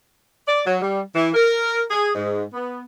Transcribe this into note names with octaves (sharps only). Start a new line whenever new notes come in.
D5
F#3
G3
E3
A#4
G#4
G#2
B3